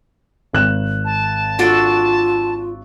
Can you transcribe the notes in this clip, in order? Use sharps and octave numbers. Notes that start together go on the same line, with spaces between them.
G#1 F#6 E7
A5
D4 F4 F#4 A4